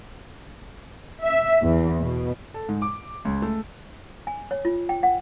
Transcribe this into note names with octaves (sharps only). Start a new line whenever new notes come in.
E5
E2
B2
A4
G#2
D6
C#2
A3
G#5
C#5
F4
G5
F#5